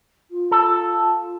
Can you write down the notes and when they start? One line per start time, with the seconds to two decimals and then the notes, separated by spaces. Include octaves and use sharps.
0.30 F4
0.51 A4